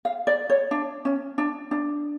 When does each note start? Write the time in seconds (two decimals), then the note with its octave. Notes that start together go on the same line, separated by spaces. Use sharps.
0.05 F5
0.27 D5
0.50 C#5
0.71 D4
1.05 C#4
1.38 D4
1.71 D4